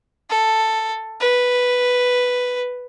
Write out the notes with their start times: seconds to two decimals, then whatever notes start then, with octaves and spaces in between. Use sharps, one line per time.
0.30 A4
1.20 B4